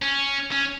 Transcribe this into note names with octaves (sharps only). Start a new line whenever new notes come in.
C#4
C#4